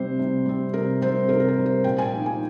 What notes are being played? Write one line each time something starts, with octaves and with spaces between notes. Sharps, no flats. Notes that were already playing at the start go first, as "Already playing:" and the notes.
Already playing: C3 G3 C4 C5
C3
G3 C4
C3 A#4
G3 C4 C5
C3 A#4
A#4
C5
G3 C4
C5
A#2 G5
G#5
F3 A#3 D#4
G#5